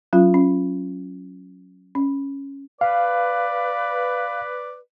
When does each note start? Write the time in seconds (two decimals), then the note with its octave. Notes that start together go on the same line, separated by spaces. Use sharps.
0.13 F#3 C#4 F4
0.34 C#4
1.95 C#4
2.81 B4 D5 F5